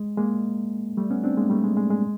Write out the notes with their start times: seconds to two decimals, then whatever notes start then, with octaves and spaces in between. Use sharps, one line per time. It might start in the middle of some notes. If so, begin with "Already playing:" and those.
Already playing: G#3
0.18 G#3 A#3
0.97 G3 A3
1.10 B3 C#4
1.24 C4 D4
1.37 G#3 A#3
1.50 G3 A3
1.64 G#3
1.77 G#3
1.90 G#3